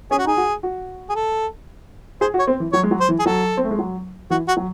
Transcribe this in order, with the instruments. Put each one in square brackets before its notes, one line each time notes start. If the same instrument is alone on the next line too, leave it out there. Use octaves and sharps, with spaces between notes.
[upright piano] C#4 [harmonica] G#4
[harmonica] F#4
[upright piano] D#4
[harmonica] G#4
[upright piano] F#4
F#4
[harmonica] G#4
A4
[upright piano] G#4 [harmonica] C5
[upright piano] F#4
[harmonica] C#5
[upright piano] C4
E3
[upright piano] F#3 [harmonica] C#5
[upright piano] G#3
F#3
[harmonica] C5
[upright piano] E3
[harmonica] G#4
[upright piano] F#3 [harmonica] A4
[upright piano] C4
A3
G#3
F#3
[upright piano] E3 [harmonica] F#4
[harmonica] F#4
[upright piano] F#3